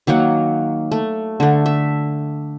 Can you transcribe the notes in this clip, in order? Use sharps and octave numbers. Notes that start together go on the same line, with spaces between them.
D#3 F#3 A#3 F#5
A3
D3 A3
E5